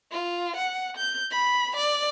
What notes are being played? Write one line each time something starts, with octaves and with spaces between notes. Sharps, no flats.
F4
F#5
G6
B5
D5